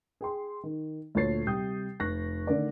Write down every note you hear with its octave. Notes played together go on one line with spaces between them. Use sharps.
G#4 G5 C6
D#3
D2 A#2 A4 C#5 A6 C7
C3 G3 G5 D#6 G6
F1 C#6 F#6 A#6
D3 D#3 A3 A#4 D5